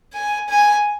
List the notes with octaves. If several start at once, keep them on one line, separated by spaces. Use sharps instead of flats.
G#5
G#5